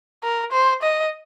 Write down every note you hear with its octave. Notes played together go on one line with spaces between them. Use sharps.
A#4
C5
D#5